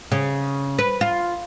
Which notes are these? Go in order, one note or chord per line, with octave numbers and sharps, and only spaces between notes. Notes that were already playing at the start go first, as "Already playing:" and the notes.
C#3
B4
F4